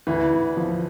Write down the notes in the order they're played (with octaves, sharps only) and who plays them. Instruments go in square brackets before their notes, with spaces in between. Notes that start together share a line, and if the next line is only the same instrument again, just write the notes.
[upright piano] D2 [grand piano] E3
[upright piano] D2
F3